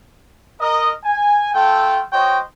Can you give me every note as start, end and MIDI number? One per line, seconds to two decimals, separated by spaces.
0.61 0.90 70
0.61 0.90 75
1.04 1.50 80
1.54 2.00 57
1.54 2.00 65
1.54 2.00 69
1.54 2.00 79
2.12 2.39 66
2.12 2.39 72
2.12 2.39 73
2.12 2.39 75
2.12 2.39 79